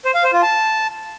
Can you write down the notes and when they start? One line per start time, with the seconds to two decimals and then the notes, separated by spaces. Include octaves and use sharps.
0.05 C5
0.14 F5
0.24 C5
0.33 F4
0.42 A5